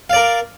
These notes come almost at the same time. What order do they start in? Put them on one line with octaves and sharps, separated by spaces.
F5 D5 A#4